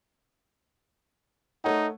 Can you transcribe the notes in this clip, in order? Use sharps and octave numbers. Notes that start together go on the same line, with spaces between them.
A3 D#4 C#5 F#5